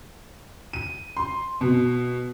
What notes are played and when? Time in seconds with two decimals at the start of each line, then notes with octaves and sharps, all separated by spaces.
0.73 D#7
1.17 C6
1.61 B2